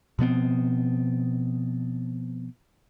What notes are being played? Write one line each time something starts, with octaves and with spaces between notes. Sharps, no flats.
B2 F3 B3 C4